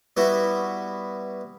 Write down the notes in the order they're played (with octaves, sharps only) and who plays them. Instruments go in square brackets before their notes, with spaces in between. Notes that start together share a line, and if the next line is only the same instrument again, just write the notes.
[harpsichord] G3 B3 E4 F#4